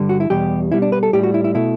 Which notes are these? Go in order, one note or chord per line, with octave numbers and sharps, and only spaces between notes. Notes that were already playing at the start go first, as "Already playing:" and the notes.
Already playing: G2 D3 G3
F#4
E4
E2 B2 G3 G4
B2 G3 E4
D4
B4
A4
A2 G3 G4
F#4
E4
E4
B2 A3 E4